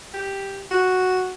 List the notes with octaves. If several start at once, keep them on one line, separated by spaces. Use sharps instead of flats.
G4
F#4